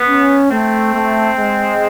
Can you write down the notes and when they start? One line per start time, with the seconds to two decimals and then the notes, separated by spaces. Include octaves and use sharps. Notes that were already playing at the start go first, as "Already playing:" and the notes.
Already playing: B3
0.08 C#4
0.51 A3 C4
0.94 A3
1.37 G#3